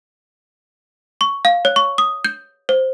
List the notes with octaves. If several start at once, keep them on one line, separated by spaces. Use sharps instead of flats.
C#6
F5
C#5
C#6
D#6
G6
C5